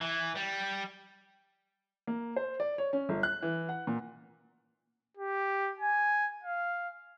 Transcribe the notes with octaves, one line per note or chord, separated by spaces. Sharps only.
E3
G3
A#3
C5
D5
C#5
C#4
G1
F#6
E3
F#5
A#2
G4
G#5
F5